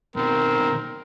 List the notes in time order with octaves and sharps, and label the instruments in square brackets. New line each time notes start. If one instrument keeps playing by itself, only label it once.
[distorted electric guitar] B2 D#3 [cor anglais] C4 [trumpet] A#4